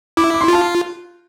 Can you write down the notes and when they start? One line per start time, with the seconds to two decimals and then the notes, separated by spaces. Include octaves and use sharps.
0.17 E4 D6
0.34 D6
0.41 C6
0.48 F4 A5